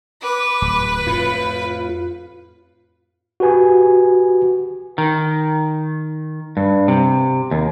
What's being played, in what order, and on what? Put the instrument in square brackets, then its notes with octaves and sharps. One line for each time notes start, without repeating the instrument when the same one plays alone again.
[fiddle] B4 [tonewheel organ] D6
[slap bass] D1
[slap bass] F2 A2 [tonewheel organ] F4
[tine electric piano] F#4 G4 B4 G#5
[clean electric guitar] D#3
G2
C3
D#2